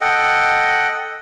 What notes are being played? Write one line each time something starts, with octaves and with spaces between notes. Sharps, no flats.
A4 D#5 F#5 G5